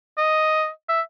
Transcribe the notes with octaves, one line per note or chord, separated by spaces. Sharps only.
D#5
E5